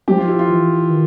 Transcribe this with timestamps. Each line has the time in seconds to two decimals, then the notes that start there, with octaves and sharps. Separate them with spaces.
0.08 F3 G4
0.18 F4
0.28 E4
0.39 F4
0.48 E3
0.90 D#3